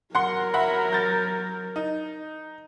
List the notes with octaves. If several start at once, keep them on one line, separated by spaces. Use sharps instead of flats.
F#3 A#4 F#5 C6
E5 F#5 B5
G6 A6
D#4